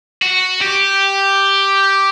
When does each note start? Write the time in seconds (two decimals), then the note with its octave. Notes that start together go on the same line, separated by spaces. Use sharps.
0.22 F#4
0.62 G4